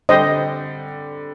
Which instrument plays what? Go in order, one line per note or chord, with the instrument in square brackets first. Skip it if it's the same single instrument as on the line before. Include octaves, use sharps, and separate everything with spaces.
[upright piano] D3 G3 C4 [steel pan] C5 D#5